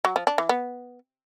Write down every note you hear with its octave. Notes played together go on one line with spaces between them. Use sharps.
F#3
F3
D4
E3
B3